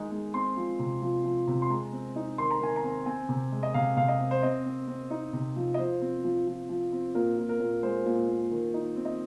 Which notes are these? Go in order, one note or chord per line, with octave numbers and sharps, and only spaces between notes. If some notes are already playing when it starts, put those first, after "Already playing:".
Already playing: D#3 G#3 D#4
G#3
C4 C6
F3
C3
F3
F3
C3
C6
G#3 A#5
C4
D#4
D#3 C6
A#5
D#3 G#5
A#5
C4
C4 G#5
C3
G#3
D#5
C3 F5
C3 F5
D#5
C4
C5
C4 D#5
C4
C4
D#4
C3
F3
D#5
F3 C5
C4
F3
F3
F3
C4
A#2 A#4
A#2
A#4
A#2
G#3 C5
A#2
A#2
D#3
D#4
C4
D#5